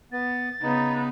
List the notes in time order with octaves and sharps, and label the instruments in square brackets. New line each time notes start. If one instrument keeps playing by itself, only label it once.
[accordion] B3 [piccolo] A6
[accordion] C#3 D#4 [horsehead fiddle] B3 B4